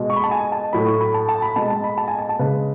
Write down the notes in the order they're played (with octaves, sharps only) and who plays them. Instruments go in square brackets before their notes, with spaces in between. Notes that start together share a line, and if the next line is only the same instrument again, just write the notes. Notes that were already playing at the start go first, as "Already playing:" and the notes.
Already playing: [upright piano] B2 G#3
C#6
B5
A5
G#5
A5
A2 F#3 B5
C#6
B5
A5
A5
B5
B2 G#3 A5
A5
B5
A5
G#5
A5
A5
C#3 G#3 B4